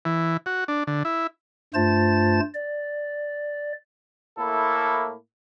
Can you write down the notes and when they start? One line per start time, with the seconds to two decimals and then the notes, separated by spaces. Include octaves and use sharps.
0.05 E3
0.46 F#4
0.68 D4
0.87 D3
1.05 E4
1.74 G2 A3 F4 C5 A5 A6
2.54 D5
4.38 A2 A#3 E4 A4